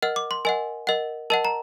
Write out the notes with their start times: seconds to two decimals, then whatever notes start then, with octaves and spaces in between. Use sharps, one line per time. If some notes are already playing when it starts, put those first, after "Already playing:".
0.02 A#4 D#5 F#5 F6
0.16 D6
0.31 C6
0.45 A#4 D#5 F#5 G#5
0.87 A#4 D#5 F#5
1.30 A#4 D#5 F#5 A5
1.45 A#5